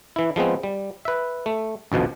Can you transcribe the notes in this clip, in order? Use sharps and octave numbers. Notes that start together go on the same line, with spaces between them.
E3 E4
F3 G#3 B3 C4
G3
B4 E5
A3
A1 D2 B2 F3